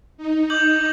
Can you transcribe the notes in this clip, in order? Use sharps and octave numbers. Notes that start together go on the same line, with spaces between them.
D#4
D6 G6 F#7